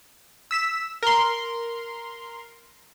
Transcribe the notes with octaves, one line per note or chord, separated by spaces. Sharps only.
E6 B6 E7
A#4 C6